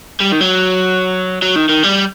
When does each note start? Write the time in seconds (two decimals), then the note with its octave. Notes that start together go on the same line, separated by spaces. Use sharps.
0.21 G3
0.32 D#3
0.41 F#3
1.42 F#3
1.56 D#3
1.69 D#3
1.83 G3